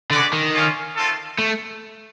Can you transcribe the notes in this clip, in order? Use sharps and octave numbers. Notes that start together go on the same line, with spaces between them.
D3 G#3 C#4 F#4 B4 D5
D#3
A#3 C#4 F4
A3 C4 F4 A4
A3